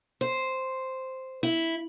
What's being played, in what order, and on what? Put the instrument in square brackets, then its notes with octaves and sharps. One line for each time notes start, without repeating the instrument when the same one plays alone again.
[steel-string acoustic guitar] C5
E4